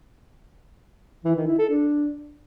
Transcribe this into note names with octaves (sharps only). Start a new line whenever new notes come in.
E3
D#3
E4
A4
D4